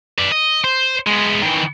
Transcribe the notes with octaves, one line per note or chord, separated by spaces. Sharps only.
B4 D5
D#5
C5
G#3 B3
D#3 E3